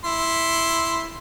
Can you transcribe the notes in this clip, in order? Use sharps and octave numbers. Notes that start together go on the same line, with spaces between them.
E4 C6